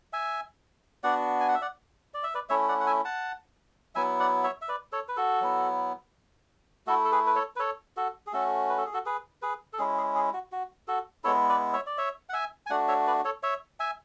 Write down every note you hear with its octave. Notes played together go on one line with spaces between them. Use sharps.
E5 G#5
B3 D4 F#4 D5 F#5
G#5
F#5
E5
D5 F#5
D5
E5
B4 D5
A3 C#4 E4 C#5 E5
D5 F#5
F#5
E5 G#5
F#5 A5
F#3 B3 E4 E5 G#5
D5 F#5
C#5 E5
E5
B4 D5
A4 C#5
B4
F#4 A4
F#3 B3 E4
A3 E4 F#4 A4
A4
G#4 B4
B4
A4 C#5
B4
A4 C#5
F#4 A4
G#4
A3 C#4 F#4 A4
B4
A4
G#4
F#4 A4
G#4 B4
G#4 B4
A4
G#3 C#4 E4 G#4
G#4
G#4
F#4
F#4
F#4 A4
G#3 B3 E4 A4 C#5
B4 D5
C#5 E5
D5
C#5 E5
F#5
E5 G#5
G#5
A3 D4 F#4 D5 F#5
C#5 E5
B4 D5
A4 C#5
C#5 E5
E5 G#5